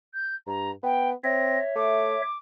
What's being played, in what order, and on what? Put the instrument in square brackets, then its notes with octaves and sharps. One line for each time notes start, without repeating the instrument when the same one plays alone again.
[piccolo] G6
[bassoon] G2 [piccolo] A#5
[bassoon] B3 [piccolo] G5
[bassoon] C4 [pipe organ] C#5 E5 [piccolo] A#6
[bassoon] A3 [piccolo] D6